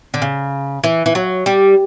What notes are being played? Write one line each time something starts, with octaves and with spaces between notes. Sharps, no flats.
D3
C#3
E3
E3
F#3
G3